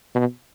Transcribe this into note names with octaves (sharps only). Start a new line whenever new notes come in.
B2